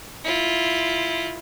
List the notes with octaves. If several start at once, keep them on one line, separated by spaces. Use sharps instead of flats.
E4 F4